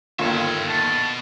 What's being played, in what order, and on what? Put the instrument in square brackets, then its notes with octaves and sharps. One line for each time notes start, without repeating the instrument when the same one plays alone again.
[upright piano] G1 D#2 [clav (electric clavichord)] A#3 F4 [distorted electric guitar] C#5 E5
[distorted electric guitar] B2 [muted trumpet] A5